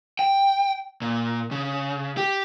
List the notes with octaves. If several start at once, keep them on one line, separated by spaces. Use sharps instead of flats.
G5
A#2
C#3
G4